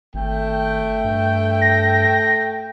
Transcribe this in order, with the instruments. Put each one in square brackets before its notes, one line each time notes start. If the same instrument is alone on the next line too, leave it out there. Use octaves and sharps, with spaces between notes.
[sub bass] G#1 [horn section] A3 G5
[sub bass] G2
[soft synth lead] A#6